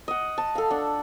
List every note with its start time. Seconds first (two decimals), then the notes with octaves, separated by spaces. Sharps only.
0.08 D#5 F#5
0.38 A5
0.55 A4 F5
0.70 D4 F#5